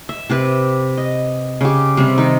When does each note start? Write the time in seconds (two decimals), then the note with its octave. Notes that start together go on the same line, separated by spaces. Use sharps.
0.09 E5
0.29 C3 G4 B4
0.97 D#5
1.61 C#3 G4
1.97 C3 G3 C4
2.18 D#3 D#4